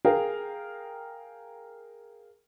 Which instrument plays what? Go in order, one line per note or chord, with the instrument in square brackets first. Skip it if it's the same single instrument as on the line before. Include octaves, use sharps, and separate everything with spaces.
[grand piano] G#4 A#4 F5 G5